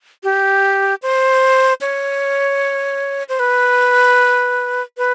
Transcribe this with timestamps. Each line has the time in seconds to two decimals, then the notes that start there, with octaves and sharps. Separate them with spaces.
0.24 G4
1.02 C5
1.81 C#5
3.29 C5
3.39 B4
4.98 B4